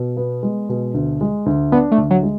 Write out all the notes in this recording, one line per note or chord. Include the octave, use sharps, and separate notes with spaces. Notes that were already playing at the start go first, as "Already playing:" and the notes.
Already playing: B2
B3
G#3
B2
D2
G#3
D2
B3 D4
A3
D2
F#3
G#3